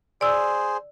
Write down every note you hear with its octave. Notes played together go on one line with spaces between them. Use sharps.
G#4 C5 D5 E6